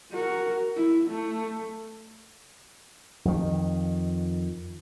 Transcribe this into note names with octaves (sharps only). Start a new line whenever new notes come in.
F#4 A#4
E4
A3
F2 D#3